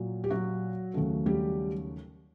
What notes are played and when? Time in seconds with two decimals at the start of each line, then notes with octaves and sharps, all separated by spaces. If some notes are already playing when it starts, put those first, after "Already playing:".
Already playing: A#2 F#3 A#3
0.24 G4
0.30 F#3 F#4
0.94 D#2 C#3 F#3 A3
1.26 G3 G4